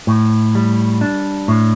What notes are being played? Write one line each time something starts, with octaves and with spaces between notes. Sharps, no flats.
A2
G3
D4
A2